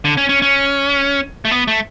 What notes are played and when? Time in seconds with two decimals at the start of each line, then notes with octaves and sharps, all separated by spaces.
0.05 D3
0.17 C#4
0.29 C#4
0.42 C#4
1.45 A3
1.51 B3
1.68 A3